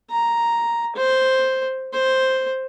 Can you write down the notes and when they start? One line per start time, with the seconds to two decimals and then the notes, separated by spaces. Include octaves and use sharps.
0.10 A#5
0.96 C5
1.93 C5